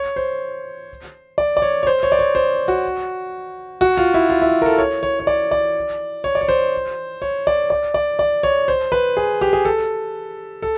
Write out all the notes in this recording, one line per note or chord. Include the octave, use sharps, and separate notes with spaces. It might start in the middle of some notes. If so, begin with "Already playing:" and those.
Already playing: C#5
C5
D5
D5
C#5
C#5
C5
C#5
D5
C#5
C5
F#4
F#4
F4
E4
F4
E4
A#4
A4
C#5
C#5
C#5
D5
D5
C#5
D5
C#5
C5
C#5
D5
D5
D5
D5
C#5
C5
B4
G#4
G4
G#4
A4
A4